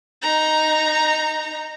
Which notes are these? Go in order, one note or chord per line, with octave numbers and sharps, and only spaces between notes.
D#4 A#5